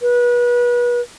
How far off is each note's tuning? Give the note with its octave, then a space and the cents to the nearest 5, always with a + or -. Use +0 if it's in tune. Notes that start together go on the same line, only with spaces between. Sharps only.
B4 -30